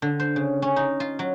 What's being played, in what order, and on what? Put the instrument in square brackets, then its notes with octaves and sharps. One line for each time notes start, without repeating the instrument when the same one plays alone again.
[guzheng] D3
C5
C#3
C#4
D#4
F4
F#3